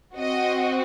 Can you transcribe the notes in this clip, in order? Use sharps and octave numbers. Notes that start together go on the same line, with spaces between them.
C4 F#4 D#5